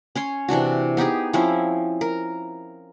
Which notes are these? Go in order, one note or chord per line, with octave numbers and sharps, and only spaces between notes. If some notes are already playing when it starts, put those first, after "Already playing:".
C#4 C#5 C6
C3 E3 D4 F#4
B3 D#4 G4 G#4
F3 C4 C#4 E4
A#4